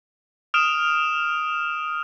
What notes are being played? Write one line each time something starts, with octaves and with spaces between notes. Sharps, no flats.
D#6 F6 D7 E7